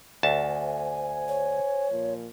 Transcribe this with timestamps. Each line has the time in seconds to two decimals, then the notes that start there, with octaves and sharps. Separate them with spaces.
0.23 D2 C5 G#5 A5
1.28 C#5
1.90 A#2 F3